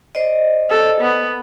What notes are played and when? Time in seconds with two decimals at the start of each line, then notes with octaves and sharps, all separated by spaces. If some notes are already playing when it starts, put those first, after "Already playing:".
0.15 C5 D5 D#5
0.70 A4
1.01 B3